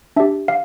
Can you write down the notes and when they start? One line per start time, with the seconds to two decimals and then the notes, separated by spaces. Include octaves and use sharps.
0.16 D4 G4 E5
0.48 F5